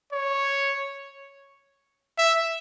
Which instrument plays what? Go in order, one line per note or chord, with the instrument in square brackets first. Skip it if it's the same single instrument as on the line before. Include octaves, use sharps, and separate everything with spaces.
[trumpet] C#5
E5